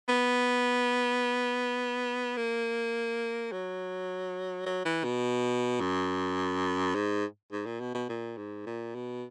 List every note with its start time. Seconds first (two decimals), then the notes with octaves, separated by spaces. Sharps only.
0.09 B3
2.37 A#3
3.52 F#3
4.66 F#3
4.85 E3
5.04 B2
5.80 F#2
6.95 G#2
7.52 G#2
7.66 A#2
7.80 B2
7.94 B2
8.09 A#2
8.37 G#2
8.66 A#2
8.95 B2